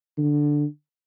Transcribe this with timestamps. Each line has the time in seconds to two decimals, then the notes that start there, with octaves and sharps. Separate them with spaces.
0.18 D3